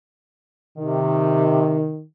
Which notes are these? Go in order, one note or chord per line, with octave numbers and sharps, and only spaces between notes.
C3 D#3